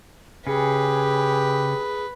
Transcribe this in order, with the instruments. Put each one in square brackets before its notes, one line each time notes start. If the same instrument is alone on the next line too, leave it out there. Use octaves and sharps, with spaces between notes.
[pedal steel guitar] C#3 [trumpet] G4 [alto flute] G#4 [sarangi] B4